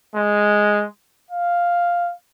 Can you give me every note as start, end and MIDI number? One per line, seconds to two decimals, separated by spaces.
0.16 0.86 56
1.31 2.13 77